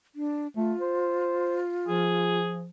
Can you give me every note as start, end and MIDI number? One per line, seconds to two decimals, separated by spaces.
0.15 0.48 62
0.57 0.74 57
0.57 2.39 65
0.81 1.59 72
1.88 2.69 53
1.88 2.62 68